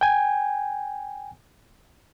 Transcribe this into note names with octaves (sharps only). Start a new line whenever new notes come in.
G5 G#5